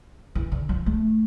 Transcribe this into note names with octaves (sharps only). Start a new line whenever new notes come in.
E3
D3
F3
A3